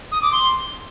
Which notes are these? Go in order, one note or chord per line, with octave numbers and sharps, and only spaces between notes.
D#6
D6
C6